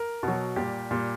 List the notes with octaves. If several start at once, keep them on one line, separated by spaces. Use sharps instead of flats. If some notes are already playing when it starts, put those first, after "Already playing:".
Already playing: A#4
B2 F#3
A#2 G3 G4
A#2 G3